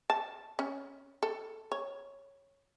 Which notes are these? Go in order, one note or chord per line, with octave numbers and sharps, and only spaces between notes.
A5
C#4
A4
C#5